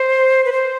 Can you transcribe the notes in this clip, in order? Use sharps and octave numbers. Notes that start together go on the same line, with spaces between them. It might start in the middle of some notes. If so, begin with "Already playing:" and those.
Already playing: C5
B4
C5